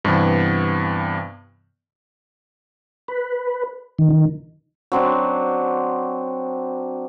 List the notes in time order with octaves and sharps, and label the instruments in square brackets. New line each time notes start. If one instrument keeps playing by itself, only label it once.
[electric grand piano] G2 C3 E3 B3
[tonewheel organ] B4
D#3
D#3
[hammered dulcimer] F#3 C4 D4